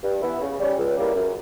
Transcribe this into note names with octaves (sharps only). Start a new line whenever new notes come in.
G2
E3 B3 E4
C#3
G3 C#4
C#2
C#3 G3 A#3 E4
F#2